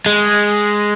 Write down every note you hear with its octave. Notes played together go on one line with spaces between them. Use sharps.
G#3